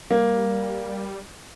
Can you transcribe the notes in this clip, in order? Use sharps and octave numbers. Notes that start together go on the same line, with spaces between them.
G3 A#3